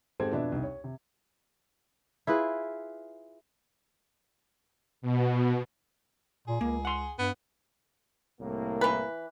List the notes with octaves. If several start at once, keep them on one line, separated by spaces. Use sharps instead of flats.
G#2 C4 G4 A4 C5 G#6
F2 B2 D4 B4 E5
C2 D#4
C#5
C3
E4 F4 G#4 B4
B2
A#2 G#4
C#2 A#3
F#5 C6
G2 B3
C2 A2 A#3
E3 B4